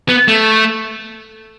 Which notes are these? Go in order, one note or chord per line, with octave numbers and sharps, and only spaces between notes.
B3
A3